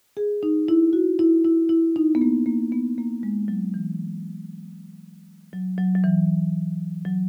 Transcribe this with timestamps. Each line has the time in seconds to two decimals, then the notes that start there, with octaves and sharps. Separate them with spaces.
0.17 G#4
0.43 D#4
0.68 E4
0.93 F#4
1.19 E4
1.45 E4
1.69 E4
1.96 D#4
2.15 B3
2.21 A#3
2.46 A#3
2.72 B3
2.98 A#3
3.23 G#3
3.48 F#3
3.74 E3
5.53 F#3
5.78 F#3
5.95 F#3
6.04 E3
7.05 F#3